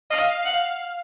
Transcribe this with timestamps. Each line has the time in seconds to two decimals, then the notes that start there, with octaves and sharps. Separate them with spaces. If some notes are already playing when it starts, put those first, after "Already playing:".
0.10 D#5 F5
0.45 F#5